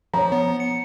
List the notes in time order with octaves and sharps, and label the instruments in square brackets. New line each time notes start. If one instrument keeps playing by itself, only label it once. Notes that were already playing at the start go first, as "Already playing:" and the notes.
[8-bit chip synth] F3 [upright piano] C#5 A#5
[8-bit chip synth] B3
C#7